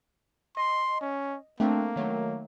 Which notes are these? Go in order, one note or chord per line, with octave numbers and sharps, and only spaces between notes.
D#5 C6
C#4
A3 A#3 C4 D4
D#3 F#3 A3